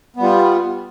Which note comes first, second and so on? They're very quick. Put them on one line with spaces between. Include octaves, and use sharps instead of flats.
B3 G3 F4